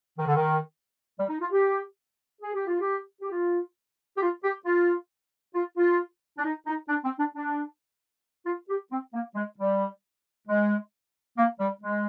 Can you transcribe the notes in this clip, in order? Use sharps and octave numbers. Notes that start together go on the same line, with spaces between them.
D#3
D3
D#3
G3
D#4
F4
G4
G#4
G4
F4
G4
G4
F4
G4
F4
G4
F4
F4
F4
D4
D#4
D#4
D4
C4
D4
D4
F4
G4
C4
A#3
G#3
G3
G#3
A#3
G3
G#3